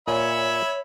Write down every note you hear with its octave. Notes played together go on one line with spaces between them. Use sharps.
A#2 C#5 E5 G#5 B5